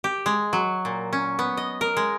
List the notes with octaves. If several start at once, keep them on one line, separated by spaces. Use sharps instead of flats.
G4
G#3
F#3
A#2
C#4
B3
D#5
A#4
G#3